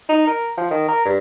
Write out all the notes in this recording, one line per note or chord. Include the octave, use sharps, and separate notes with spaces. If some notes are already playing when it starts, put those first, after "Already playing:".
D#4
A#4
F3
D#3
A#4
G2